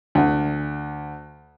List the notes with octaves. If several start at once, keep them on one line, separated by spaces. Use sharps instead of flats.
D2